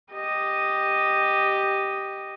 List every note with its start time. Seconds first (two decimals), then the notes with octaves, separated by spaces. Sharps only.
0.12 G4 D#5